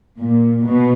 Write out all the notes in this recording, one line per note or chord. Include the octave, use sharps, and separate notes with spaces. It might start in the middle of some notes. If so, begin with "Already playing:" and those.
A#2
B2